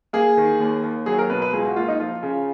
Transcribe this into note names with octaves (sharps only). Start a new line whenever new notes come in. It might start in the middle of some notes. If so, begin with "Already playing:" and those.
A#3 G#4
D#3
D#2
D#2
F#3 G#4
A#4
B2 B4
B4
C#2 G#4
F#4
A#3 F4
D#4
F3 F4
C#3